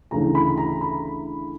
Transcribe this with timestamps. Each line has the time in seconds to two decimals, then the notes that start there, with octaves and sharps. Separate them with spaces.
0.11 D2 C#3 E3 A3 A#5
0.35 B5
0.58 A#5
0.81 B5